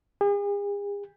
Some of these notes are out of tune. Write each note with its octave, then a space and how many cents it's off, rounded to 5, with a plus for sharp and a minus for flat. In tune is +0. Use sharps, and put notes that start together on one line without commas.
G#4 -45